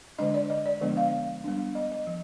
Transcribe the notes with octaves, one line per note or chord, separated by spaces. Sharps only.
D3 G#3 D4 D#5
D5
D#5
D5
D3 F3 G#3 B3 D4
F5
G3 B3 D4
D#5
D#5
F3